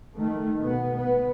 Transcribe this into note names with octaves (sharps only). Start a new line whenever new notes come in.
D#3 A3
B2 B3
B3